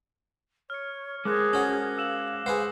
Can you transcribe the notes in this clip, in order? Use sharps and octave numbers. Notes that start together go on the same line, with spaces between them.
C#5 F6 C#7
G#3 G#4 A#4 C5 D6 F#6 A#6
C#4 F#4
F5 E6 E7 F#7
G#4 B4 C5 F#5 C7